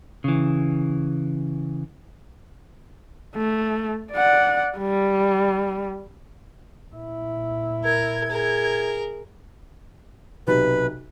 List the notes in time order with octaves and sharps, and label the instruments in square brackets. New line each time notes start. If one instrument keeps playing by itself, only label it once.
[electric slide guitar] C#3 E3
[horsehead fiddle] A3
D5 F#5
G3
[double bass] A#2 E4
[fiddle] A#4 [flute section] G#6
[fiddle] G#4 A#4
[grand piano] B1 C3 [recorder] B4